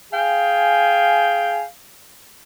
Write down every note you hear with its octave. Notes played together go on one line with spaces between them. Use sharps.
G#4 F5 G5 G#5